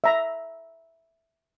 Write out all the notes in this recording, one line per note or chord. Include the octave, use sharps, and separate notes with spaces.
E5 A#5